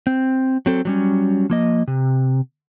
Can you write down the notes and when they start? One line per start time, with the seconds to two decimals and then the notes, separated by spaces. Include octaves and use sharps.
0.07 C4
0.66 F#3 C4 A4
0.85 F#3 G3 C#4
1.50 F3 A#3 D#5
1.87 C3